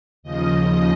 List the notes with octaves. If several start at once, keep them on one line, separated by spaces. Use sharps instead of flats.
D#2 C#3 F3 D#5
D#5